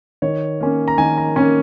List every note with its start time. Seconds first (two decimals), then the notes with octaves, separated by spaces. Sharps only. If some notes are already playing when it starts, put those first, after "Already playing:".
0.22 D#3 C#5
0.60 A#3 C#4
0.88 A#5
0.98 D#3 G#5
1.17 A#5
1.36 A#3 C#4 G#5